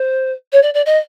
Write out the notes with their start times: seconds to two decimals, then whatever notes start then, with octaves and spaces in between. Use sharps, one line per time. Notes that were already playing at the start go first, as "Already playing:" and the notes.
Already playing: C5
0.52 C#5
0.62 D5
0.74 D5
0.86 D#5